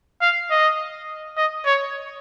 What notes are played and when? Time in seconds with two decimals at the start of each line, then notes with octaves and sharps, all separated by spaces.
0.21 F5
0.51 D#5
1.37 D#5
1.66 C#5